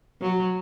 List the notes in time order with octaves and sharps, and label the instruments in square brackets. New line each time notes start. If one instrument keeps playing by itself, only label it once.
[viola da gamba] F#3